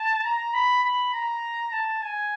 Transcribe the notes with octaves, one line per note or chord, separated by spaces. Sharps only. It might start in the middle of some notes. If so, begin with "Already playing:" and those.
Already playing: A5
A#5
B5
B5
A#5
A5
G#5